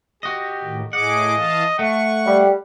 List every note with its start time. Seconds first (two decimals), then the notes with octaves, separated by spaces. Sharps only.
0.23 F#4 G4 D#5
0.63 A2 D#3
0.93 A2 G#4 D#5 F#5 D6
1.36 E3 F5 A5
1.79 A3 F#5 C#6
2.27 G3